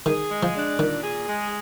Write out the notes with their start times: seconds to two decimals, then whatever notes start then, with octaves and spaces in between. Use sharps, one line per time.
0.06 D#3 G#4
0.31 G#3
0.43 F3
0.55 D4
0.79 A#2 D#3
1.03 G#4
1.28 G#3